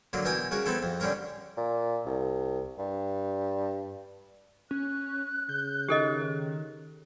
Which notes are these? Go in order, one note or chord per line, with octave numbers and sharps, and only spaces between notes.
D3 F#3 A#3
B2 E3 A#4 G5 G#5 D#6
C#3 F#4 A#4 G#5
B3 C4 D#4 E4 A4
F2
D3 G3 C#4 A#4 A#5
A#2
C2
G2
C#4 F#6
C#3 G6
D#3 G4 A4 D#5